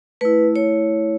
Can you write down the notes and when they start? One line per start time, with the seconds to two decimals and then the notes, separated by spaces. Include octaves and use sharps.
0.21 A3 E4 B4
0.56 C#5